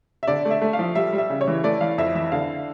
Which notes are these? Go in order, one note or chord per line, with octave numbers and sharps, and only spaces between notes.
E5
D3 D5
A3
E5
A3
F5
F3
G3 E5
G3
E5
C#3
C#5
E3
A3 D5
E3 F5
F2 E5
E3 E5
D3 F5